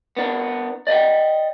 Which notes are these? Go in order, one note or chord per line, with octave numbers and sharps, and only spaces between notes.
B3 D4 A#4
D5 D#5 F#5 G5